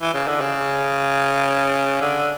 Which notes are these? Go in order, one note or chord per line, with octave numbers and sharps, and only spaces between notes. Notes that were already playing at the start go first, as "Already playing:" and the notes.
E3
C#3
D3
C#3
D3